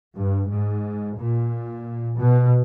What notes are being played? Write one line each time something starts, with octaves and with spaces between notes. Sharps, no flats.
G2
G#2
A#2
B2